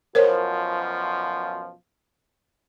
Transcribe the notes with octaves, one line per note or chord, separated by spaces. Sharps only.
F#2 B2 F3 A#4 C5 C#5